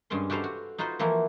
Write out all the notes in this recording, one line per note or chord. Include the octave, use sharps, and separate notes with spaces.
G2 G3 G#3 C#4 C6
F#4 G4 A4 B4 C5 F5
F#4
D#4 F4 F#4 B4 C5
E3 F3 A#3 E4 F#4